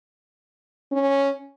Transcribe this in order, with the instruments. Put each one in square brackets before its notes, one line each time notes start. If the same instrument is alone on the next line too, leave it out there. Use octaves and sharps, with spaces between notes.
[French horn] C#4